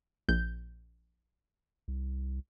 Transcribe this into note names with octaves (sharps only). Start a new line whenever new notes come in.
A#1 G6
C2